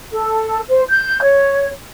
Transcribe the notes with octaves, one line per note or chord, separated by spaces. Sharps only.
A4
C5
G6
C#5